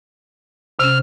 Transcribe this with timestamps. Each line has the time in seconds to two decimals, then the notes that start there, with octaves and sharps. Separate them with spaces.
0.79 C3 C#4 F6